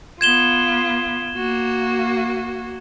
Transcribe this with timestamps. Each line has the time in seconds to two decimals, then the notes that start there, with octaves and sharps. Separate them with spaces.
0.21 B3 F4 G#6 E7 G7
1.37 A#3 F#4